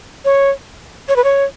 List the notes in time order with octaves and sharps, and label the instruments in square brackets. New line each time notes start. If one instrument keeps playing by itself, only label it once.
[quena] C#5
C#5
B4
C#5